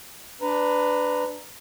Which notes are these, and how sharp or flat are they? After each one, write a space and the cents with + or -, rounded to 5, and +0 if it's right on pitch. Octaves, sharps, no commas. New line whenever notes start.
D4 +0 B4 +20 A#5 +0